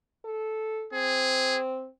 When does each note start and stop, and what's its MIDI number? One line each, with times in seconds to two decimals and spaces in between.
0.25 0.86 69
0.93 1.87 60
0.93 1.59 68